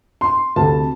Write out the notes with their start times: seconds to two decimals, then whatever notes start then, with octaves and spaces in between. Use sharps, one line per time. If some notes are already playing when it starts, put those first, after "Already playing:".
0.21 C6
0.56 D2 C3 A3 A5